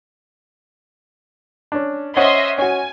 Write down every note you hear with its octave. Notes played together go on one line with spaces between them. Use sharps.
C#4 D4
C#4 C5 D#5 E5 F#5 C6
C#4 F#4 G#5